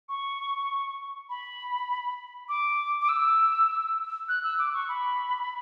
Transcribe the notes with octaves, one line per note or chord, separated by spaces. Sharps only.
C#6
B5
D6
D6
E6
F#6
E6
D6
C#6
B5